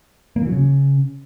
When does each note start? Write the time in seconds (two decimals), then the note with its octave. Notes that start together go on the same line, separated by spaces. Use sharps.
0.36 A#3
0.41 E3
0.47 F#3
0.52 C#3